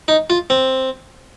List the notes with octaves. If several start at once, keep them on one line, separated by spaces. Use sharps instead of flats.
D#4
F4
C4